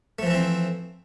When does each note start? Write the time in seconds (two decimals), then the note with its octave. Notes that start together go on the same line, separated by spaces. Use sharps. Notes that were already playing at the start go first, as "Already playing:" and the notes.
0.19 A3
0.22 F3
0.26 E3
0.30 E4
0.34 C4